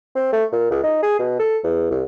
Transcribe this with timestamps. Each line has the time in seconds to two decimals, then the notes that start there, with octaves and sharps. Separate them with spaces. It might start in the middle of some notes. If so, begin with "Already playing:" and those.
0.16 C4
0.33 A3
0.52 A#2
0.71 C#2
0.83 D#4
1.02 G#4
1.19 B2
1.39 A4
1.64 E2
1.91 C2